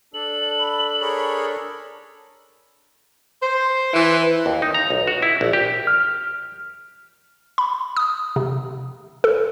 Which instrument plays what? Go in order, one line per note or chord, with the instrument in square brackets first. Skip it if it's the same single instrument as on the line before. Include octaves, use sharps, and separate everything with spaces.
[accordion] D4 A4 [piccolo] F#7
[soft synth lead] B5
[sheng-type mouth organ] G#4 A#4 C#5 [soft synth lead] B5
[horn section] C5
E3
[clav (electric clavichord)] D#2
D#4
A#5
B1
F#4
E4
A#1
G4
[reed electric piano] F6
[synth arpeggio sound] B5
D#6
C3
A4